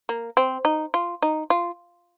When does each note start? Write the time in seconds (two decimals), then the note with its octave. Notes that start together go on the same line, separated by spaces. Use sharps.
0.09 A#3
0.37 C4
0.65 D#4
0.94 F4
1.22 D#4
1.50 F4